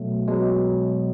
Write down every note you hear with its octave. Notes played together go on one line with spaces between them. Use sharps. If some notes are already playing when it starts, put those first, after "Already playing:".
Already playing: B2 F#3 A3
B2 F#3 G#3